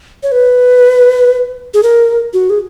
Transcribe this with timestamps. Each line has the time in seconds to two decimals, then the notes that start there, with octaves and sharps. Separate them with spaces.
0.23 C#5
0.32 B4
1.74 G#4
1.83 A#4
2.33 F#4
2.50 G#4